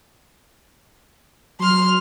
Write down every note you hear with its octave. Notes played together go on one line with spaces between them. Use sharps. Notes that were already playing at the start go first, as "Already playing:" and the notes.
F#3 C6 F6